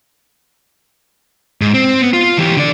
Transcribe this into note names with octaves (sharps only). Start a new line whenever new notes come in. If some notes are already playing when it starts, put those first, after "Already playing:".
G#2
C4
B3
F4
E3 G4
D3 D5